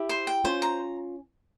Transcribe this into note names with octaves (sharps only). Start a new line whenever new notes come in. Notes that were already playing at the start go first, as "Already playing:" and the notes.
Already playing: E4 G4
C5
G5
C#4 F4 C5
A#5